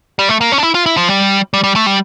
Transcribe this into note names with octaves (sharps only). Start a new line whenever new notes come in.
G3
A3
A#3
C#4
D4
E4
F4
E4
F3
G3
G3
G3
A3
G3